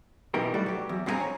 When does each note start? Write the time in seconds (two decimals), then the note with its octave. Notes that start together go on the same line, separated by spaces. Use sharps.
0.34 F#2 B2 E3 D#4 G4 A#4
0.54 G3 A3 F#4 D5
0.66 F#3 G4
0.89 E2
1.06 G2 C4 E4 G4 G#5 A#5
1.20 C#5